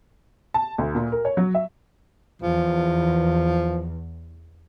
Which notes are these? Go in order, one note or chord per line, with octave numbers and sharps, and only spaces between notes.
A5
D2
A#2
A#4
C#5
F#3
E5
E2 F3